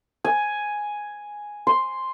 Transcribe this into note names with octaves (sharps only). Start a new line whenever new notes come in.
G#5
C6